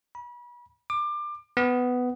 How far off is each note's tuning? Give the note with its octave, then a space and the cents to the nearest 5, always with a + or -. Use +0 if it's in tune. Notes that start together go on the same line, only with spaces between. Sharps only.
B5 -35
D6 +25
B3 +10